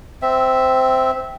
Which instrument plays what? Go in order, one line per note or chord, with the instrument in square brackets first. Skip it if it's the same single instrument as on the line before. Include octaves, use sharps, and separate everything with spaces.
[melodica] C4 E5